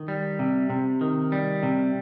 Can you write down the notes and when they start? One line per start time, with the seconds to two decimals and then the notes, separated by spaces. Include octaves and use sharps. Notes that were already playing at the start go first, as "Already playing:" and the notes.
Already playing: D#3
0.08 G3
0.39 C3
0.70 C3
1.01 D#3
1.32 G3
1.63 C3